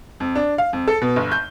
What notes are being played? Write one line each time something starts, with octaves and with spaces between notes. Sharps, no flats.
F2
D4
F5
F2
A4
B2
G1
G6